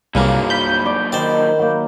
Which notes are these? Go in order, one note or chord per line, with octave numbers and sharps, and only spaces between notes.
C2 G2 A#2 C#3 F#3 A#3
B5 G6
D5
D#3 C5 D5
F#3 A#3